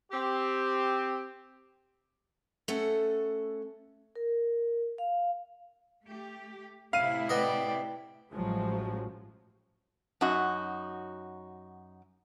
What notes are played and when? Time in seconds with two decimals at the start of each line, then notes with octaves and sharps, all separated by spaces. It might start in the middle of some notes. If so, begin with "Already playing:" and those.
0.12 C4 G4
2.68 A3 C#4 A4 F#5
4.16 A#4
4.98 F5
6.05 A3 G4
6.93 A2 C3 E4 F5 D#7
7.29 B3 D5 D#5 G5
8.31 A1 F3 F#3 G#3
10.21 F#2 D#4 F#4